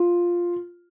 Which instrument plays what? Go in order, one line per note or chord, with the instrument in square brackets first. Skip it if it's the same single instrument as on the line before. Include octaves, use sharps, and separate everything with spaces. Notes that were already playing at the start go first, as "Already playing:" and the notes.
Already playing: [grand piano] F4